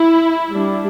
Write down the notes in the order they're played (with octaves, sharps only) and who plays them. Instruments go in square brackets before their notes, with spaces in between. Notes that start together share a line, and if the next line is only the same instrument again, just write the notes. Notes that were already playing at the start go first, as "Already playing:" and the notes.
Already playing: [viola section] E4
G3 D4